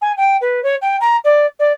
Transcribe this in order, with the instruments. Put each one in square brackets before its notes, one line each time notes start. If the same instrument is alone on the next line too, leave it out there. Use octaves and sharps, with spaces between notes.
[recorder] G#5
G5
B4
C#5
G5
A#5
D5
D5